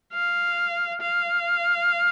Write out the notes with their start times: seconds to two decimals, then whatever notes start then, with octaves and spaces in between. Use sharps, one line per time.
0.13 F5
1.01 F5